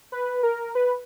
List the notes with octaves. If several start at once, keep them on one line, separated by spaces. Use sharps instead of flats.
B4
A#4
B4